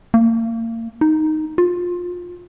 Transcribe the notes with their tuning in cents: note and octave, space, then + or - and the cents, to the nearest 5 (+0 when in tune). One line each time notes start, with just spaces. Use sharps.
A#3 -35
D#4 +0
F4 +20